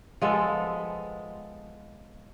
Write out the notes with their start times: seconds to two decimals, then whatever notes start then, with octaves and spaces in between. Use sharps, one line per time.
0.22 F3 G#3 B3 A4